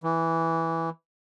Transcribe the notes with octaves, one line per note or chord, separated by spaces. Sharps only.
E3